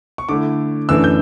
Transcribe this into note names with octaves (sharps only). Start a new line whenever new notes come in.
C#6
D3 A3 E4 D6
F#2 E3 A3 D4 E6
G6